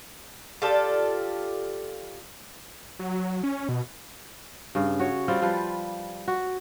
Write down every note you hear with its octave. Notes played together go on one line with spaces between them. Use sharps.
F4 G4 A4 D5
F#3
C#4
B2
G2 C#3
F#4 C#5
G3 C4 F4
F3 G3 B4
F#4